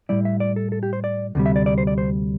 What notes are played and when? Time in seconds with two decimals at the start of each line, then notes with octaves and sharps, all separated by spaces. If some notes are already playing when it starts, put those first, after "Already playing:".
0.09 A2 G3 E4 D5
0.25 E5
0.40 D5
0.56 A4
0.72 A4
0.83 G4
0.93 C5
1.04 D5
1.35 D2 C3 G3
1.46 E5
1.56 D5
1.66 D5
1.78 C5
1.87 D5
1.98 C5